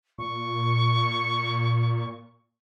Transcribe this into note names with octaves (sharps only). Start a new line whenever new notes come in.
A#2 C#6